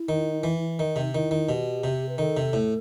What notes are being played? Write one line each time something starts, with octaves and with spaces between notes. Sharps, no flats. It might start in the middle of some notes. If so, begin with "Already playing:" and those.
Already playing: E4
D#3
E3
D#3 D#4
C3
D#3 E4
D#3
B2 G4
C3
B4
D#3 A4
C3
A2